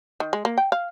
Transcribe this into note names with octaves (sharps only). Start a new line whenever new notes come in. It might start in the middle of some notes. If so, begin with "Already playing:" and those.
D#3
G#3
A#3
G5
F5